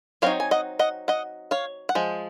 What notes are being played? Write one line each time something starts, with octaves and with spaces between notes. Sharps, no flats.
F#3 C4 D#4 C#5 F5
G#5
D#5 F#5
D#5 F#5
D#5 F#5
C#5 F5
F#5
F3 G#3